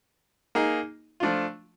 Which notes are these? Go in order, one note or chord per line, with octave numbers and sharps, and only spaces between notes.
A#3 D#4 G#4
F3 A3 D4 F4